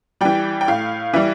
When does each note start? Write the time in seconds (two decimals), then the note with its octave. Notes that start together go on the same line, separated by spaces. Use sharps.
0.21 E3 G3 G5
0.61 G5
0.68 A2 F5
1.13 E3 G3 E5